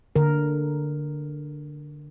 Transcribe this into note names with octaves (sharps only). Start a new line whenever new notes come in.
D3 A#4